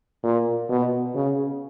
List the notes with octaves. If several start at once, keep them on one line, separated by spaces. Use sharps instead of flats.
A#2
B2
C#3